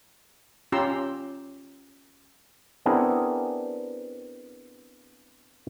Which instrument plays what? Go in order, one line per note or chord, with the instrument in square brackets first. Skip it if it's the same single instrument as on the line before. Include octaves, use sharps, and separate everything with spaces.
[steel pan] C#4 F4 G4 A#5 C6 E6
[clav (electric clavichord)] B3 C4 D4 E4 G#4 A#4